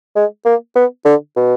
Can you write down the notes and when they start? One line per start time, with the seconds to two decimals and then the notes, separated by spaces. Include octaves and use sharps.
0.16 G#3
0.45 A#3
0.76 B3
1.05 D3
1.36 B2